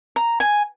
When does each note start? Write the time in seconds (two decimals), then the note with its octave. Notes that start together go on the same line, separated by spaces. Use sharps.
0.16 A#5
0.40 G#5